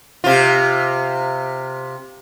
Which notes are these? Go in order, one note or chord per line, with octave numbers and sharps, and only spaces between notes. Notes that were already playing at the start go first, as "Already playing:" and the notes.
C3 F4